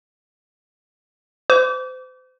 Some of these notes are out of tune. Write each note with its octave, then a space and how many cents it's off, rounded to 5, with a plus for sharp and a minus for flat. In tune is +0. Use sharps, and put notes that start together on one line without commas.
C5 -35 D6 -30